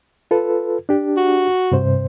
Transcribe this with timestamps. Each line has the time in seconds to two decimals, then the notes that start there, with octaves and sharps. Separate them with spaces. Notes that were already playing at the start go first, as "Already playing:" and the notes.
0.31 F4 A4 B4
0.89 D4 G4
1.17 F#4
1.72 G2 C3 C5